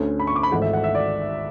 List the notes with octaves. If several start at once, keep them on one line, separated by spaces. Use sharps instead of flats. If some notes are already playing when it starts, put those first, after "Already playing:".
Already playing: D2 D3 A3 C#4
B5
C#6
D6
B5
G#1 G#2 E3 A3 F#5
E5
F#5
E5
D5